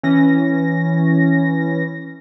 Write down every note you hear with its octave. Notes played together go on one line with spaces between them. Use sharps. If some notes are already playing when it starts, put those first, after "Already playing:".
E3 C#4 A#6